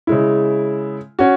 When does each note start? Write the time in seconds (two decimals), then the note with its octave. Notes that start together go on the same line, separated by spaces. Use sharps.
0.07 C#3 G#3 E4
1.19 C#4 F#4